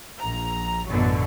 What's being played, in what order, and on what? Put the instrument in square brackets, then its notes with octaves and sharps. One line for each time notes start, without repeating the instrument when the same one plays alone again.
[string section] A#1 A#5
A1 F#2 B2 D3 F#3